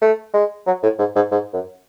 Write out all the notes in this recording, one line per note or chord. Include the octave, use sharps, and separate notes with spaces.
A3
G#3
F#3
A2
G#2
G#2
G#2
F#2